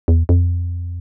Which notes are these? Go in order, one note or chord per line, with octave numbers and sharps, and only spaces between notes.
E2
F2